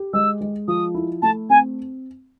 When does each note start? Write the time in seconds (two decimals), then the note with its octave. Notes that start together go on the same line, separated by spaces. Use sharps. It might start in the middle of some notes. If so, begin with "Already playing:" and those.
Already playing: G4
0.13 G#3 E6
0.41 G#3
0.68 F3 D#6
0.94 E4
1.22 A3 A5
1.50 C4 G#5